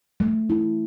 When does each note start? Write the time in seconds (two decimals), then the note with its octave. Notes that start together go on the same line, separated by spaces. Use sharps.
0.20 A3
0.50 E4